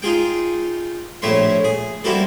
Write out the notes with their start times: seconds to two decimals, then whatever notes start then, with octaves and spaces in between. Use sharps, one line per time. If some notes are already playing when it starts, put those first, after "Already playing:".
0.02 D#4 F4 G#4 G5
1.22 A#1 A2 A3 C#5 E5 C6
1.64 G#4
2.04 G3 A#3 C4 E4 F#4 A4